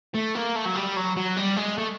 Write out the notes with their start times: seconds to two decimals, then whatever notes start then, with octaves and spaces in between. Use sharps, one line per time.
0.14 A3
0.35 A#3
0.56 A3
0.66 F#3
0.76 G3
0.97 F#3
1.17 F#3
1.37 G3
1.57 G#3
1.78 A3